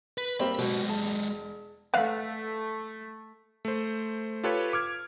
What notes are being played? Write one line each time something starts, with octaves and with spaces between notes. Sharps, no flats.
B4
G3 A#3 C4 B5
B2 G#3 G4
E1 A5
A3 B4 D5 F5 F#5
A3 C5
F4 G4 A4 B4 C#5
D6 F6 G#6